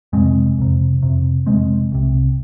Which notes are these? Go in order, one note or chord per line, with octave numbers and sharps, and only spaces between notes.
F2 C3 G#3 C4
F2 C3
F2 C3
F2 C3 G#3 C4
C2 C3